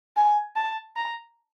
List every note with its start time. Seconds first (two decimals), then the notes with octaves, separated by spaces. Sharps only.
0.17 G#5
0.56 A5
0.96 A#5